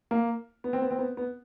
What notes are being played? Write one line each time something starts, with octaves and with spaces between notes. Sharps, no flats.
A#3
B3
C4
B3
C4
B3
B3